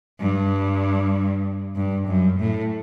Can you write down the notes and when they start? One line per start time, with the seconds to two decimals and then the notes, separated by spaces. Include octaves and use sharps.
0.20 G2
1.76 G2
2.08 F#2
2.39 A2